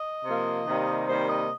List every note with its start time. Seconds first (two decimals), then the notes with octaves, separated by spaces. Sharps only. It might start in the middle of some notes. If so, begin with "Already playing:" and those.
Already playing: D#5
0.24 C3 F3 A#3
0.66 C3 D#3 G3 A#3
1.07 C3 D#3 G3 A#3 C5
1.28 D#5